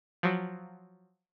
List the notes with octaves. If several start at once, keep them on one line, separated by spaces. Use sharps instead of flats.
F3 F#3